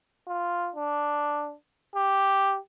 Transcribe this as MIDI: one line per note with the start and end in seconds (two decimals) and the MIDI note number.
0.27 0.70 65
0.76 1.54 62
1.96 2.57 67